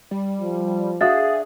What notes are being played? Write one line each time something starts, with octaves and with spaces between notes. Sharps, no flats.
G3
F3
D4 F#4 G#4 E5 F5 D#6 A6